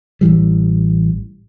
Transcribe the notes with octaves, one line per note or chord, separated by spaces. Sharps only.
A1 A2 E3 G3